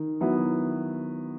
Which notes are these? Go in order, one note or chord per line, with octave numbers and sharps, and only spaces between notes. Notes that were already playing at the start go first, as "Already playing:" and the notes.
Already playing: D#3
F#3 B3 E4